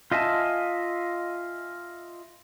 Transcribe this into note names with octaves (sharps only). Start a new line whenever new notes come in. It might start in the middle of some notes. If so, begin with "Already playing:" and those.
F4 D#5 E5 G#5 A5